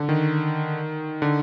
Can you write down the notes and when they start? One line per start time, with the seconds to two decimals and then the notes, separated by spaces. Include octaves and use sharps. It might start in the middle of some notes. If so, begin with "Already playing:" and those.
Already playing: D3
0.09 D#3
1.22 D3